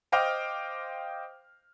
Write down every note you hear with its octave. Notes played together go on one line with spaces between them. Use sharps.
C5 D#5 F5 G5 D6 F6